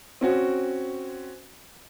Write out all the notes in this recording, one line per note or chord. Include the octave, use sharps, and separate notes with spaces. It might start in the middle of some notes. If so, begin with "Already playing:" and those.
C4 C#4 F#4